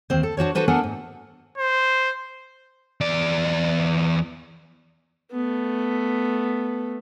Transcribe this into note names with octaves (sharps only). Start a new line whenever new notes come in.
D#2 C4 C5
A4
D4 F#4 C5 C#5
D4 F#4 A4 B4 C5
B3 D4 A4 A#4 F#5 G#5
G#2
C5
E2 D5
A3 B3